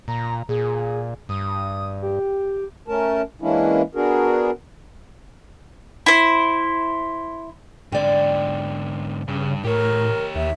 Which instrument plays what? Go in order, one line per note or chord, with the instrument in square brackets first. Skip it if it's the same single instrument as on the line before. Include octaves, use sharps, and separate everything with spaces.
[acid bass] A#2 [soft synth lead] A#5
[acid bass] A#2 [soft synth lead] G#4
[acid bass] G2 [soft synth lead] D#6
[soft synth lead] G4
[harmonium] A3 C#4 A#4 A5
E3 G#3 A#3 C#4 D4 E4
B3 D4 F#4 G#4 A#4
[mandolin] E4 C5
[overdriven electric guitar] G#2 D3 [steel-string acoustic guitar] D5 G5
[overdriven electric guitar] G2 [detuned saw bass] C#3
[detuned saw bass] A2 [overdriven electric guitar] G4 C#5 [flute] A#4
[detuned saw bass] D#2 [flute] E5